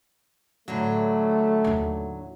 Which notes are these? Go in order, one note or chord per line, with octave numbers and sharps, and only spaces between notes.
A2 D3 F#3 A3
D#2 E4